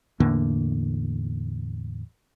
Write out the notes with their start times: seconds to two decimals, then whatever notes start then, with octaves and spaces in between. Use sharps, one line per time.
0.20 E2 A2 D3 A#3